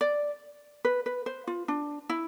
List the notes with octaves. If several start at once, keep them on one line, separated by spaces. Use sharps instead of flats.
D5
B4
B4
C5
F4
D4
E4